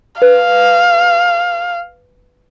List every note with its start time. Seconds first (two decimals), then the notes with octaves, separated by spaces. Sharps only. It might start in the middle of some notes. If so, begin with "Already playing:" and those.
0.22 B4 F5